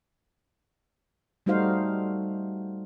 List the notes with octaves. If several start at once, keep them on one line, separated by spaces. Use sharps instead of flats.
G3 A3 D#4 F#4 C5 F5